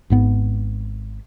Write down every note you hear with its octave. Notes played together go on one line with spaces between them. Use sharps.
G#1 G#2 B3